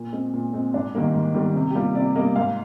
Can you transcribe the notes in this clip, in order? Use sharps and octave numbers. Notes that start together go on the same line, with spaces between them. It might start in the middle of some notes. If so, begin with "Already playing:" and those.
Already playing: A#2
G#3 C4
A#2
G#3 C4
G#2 D4
D#3 G3 A#3
G#2
D#3 G3 A#3
C3 D#4
G4
G3 A#3 F4
C3 D5
G3 A#3 D#5
G#2 F5